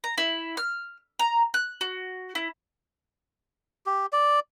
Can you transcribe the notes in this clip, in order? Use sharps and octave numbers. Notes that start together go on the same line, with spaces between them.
A#5
E4
F6
A#5
F#6
F#4
E4
G4
D5